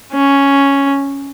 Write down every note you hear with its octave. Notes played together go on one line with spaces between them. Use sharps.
C#4